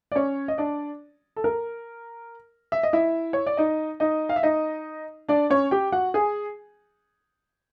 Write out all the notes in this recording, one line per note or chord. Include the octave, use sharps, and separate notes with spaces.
D5
C#4 C#5
D#5
D4 D5
A4
A#4
E5
D#5
E4 E5
C#5
D5
D#4 D#5
D#4 D#5
F5
E5
D#4 D#5
D4 D5
C#4 C#5
G4 G5
F#4 F#5
G#4 G#5